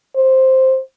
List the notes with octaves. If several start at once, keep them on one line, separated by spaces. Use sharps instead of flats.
C5